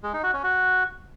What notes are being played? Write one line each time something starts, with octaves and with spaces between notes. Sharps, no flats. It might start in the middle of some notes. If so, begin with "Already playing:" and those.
G#3
D#4
F#4
C#4
F#4